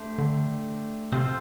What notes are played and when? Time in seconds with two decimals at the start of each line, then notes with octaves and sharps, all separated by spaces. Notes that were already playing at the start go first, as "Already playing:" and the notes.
Already playing: A3 D4 G4 C5
0.18 D3
1.12 C3 C4 F4 A4 C5